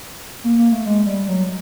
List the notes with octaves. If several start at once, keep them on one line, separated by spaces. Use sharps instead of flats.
A#3
A#3
A3
G#3
G3
F#3